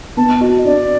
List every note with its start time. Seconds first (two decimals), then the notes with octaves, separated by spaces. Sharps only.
0.17 B3 A5
0.40 F#4 D#5
0.65 D4 D5